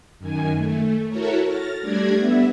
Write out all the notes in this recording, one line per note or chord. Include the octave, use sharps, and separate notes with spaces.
F#2 D#3 G#5
A3
E4 F#4 A4 A#4 C#5
F6 A6 A#6
G3 A3 D4 D5 G#6 A#6
B3 E5